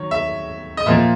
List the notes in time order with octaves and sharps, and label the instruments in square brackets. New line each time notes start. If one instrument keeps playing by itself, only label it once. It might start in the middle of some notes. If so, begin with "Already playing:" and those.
Already playing: [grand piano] D#3 F#3 C#5
E5
D#5
A#2 F3 A#3 E5